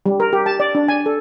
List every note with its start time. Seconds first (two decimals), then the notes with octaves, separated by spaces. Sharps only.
0.06 G3
0.20 A#4
0.33 G4
0.46 A5
0.60 D5
0.75 D4
0.88 G#5
1.06 A4